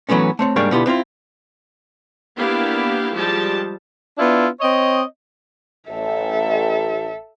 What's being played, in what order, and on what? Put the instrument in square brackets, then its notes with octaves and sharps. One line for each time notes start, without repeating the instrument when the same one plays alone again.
[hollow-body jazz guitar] E3 F#3 A3 B3 C#4
A3 C4 C#5
G#2 G3 A#3 D4 C#5 B5
B2 D3 B3 E4 F4 G4
B3 C4 E4 F4
[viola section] A#3 B3 D4 E4 G4 F5
F3 G3 G#3 G4 A5
[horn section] B3 D4 E4 F4
C4 C#5 D#5
[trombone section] A1 [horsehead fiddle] A4 E5